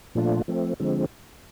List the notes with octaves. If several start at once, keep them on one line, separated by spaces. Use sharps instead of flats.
A#2 F3 A3 D4 F4
F3 A3 C4
D3 F3 G#3 C4